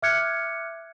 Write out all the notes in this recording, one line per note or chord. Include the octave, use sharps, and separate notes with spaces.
E5 D6 F6 F#6 G#6 C#7